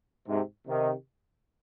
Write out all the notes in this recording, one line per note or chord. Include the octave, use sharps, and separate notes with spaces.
G#2 C3
C3 D#3